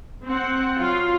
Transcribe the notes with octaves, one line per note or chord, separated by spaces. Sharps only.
C4 F#5
F#3 F4